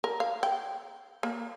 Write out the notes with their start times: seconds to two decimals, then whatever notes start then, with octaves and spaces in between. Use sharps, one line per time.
0.04 A#4
0.20 F5
0.43 G5
1.23 A#3